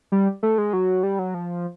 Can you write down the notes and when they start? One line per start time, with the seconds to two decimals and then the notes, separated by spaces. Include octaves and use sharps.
0.12 G3
0.43 A3
0.58 G#3
0.73 F#3
1.03 G3
1.19 F#3
1.34 F3